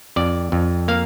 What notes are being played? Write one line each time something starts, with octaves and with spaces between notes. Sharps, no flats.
F2 D5
F2
A#3 F5